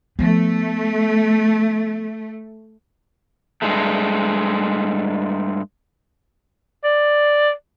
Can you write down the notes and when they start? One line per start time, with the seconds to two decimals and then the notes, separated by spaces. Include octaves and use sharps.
0.19 F3 A3 B3
3.62 G2 G#3 A3
6.84 D5